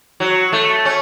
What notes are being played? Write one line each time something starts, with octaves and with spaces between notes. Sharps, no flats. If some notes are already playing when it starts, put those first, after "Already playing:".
F#3
A3
C#4